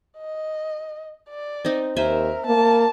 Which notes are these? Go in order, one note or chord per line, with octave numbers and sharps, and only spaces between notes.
D#5
D5
C4 D#4
D#2 A#4 C5 E5 G#5
A#3 A5